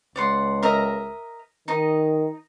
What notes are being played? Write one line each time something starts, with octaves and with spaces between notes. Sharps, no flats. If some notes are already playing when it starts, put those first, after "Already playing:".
C#2 D5 F#5 C6
A#4 D#5 E5
D#3 D#4 D#5